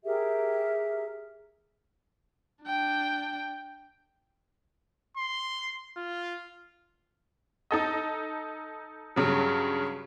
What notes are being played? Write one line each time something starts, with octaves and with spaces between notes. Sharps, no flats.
G4 G#4 A#4 E5
D4 G5
C6
F4
D#4 A4 D#5
G2 C#3 F#3